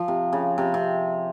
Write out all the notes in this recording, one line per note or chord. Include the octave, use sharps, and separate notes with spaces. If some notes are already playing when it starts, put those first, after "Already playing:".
Already playing: F3
C3
C#3
C3
C3